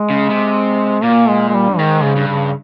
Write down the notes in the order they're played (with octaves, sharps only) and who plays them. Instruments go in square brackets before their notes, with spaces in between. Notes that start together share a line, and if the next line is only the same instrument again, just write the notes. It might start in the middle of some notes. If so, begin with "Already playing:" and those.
Already playing: [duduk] G#3
[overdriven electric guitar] C#3
C3
[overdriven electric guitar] A#2 [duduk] A#3
[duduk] G#3
G#3
G3
[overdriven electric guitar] G2
[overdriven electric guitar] G#2 [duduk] D#3
[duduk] C#3
[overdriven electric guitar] G2
[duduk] C#3